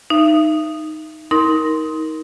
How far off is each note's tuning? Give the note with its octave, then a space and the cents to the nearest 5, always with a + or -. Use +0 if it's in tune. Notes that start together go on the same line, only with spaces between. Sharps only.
D#4 +0 E5 +35
D#4 +30 A#4 +5 C6 +0